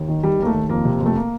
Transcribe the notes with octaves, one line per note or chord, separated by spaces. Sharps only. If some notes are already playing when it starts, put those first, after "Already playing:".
Already playing: D#2
D#3
D#3 G3
D#2 A#3
A3
D#2
F2 A#3
C3
F2
A3
A#3